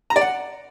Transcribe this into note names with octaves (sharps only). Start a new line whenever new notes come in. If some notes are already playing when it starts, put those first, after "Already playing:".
A#5
D5
F#5